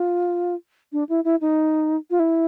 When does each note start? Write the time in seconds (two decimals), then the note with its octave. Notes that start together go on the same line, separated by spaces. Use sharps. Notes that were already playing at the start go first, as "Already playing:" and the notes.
Already playing: F4
0.93 D4
1.09 E4
1.24 E4
1.41 D#4
2.11 F4
2.19 E4